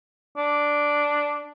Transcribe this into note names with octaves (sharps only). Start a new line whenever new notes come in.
D4